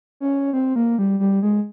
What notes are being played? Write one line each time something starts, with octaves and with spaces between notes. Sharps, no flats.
C#4
C4
A#3
G3
G3
G#3